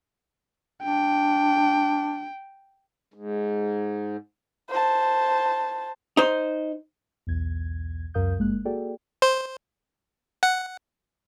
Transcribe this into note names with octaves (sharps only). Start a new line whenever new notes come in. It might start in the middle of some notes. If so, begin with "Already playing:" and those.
D4 G5
G#2
C5 A5
D#4 C5
B1 E2 G#6
C#2 F#2 A#4 F5 D#6 G6
G1 G#3 A#3 F#6
A#3 F#4 G#4 A4 D5 G5
C5
F#5